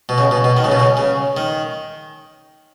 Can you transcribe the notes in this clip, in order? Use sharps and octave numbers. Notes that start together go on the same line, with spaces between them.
B2
C#3
B2
B2
D#3
C#3
B2
C#3
C#3
D#3